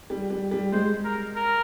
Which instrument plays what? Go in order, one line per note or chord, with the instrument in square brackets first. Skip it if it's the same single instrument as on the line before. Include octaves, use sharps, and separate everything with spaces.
[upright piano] G3
G3
G3
[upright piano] G#3 [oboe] C5
[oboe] A#4
A#4